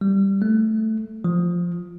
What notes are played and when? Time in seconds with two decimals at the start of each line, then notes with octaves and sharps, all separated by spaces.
0.01 G3
0.42 A3
1.24 F3